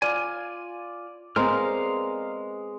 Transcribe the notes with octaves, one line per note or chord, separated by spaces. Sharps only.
F4 D5 G#5
G#3 B3 C4 A#4 F5 A#5 F6